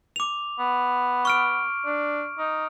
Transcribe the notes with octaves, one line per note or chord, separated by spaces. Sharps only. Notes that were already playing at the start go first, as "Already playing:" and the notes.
D6 F7
B3
C#6 F6 D7
D4
D#4